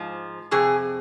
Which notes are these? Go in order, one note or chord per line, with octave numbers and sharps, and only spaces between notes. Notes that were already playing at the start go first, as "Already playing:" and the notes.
Already playing: G#2 F3
F2 C3 G#4